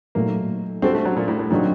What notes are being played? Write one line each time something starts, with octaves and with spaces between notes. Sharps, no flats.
A#2 F#3 A3 A#3 D#4
G3 C4 D4 F#4 A4 C5
A3
F#3
A#2
A2
A2
A#2 D3 F#3 C4 D#4 F#4